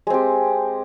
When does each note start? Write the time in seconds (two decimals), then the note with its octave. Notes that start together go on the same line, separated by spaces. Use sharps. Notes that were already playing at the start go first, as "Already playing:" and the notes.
0.07 G#3
0.10 C4
0.14 G4